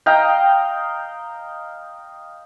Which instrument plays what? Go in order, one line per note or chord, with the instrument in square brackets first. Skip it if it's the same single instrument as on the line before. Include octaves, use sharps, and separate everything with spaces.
[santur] D#5 F5 G5 A#5